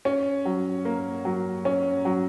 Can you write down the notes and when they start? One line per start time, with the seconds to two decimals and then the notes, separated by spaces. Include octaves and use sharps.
0.05 C#4
0.45 F#3
0.85 A#3
1.25 F#3
1.65 C#4
2.05 F#3